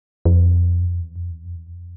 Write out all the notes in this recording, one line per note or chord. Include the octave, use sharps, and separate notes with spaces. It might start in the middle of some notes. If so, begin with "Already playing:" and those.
F2
F#2
F2
E2
F2
E2
F2
E2
F2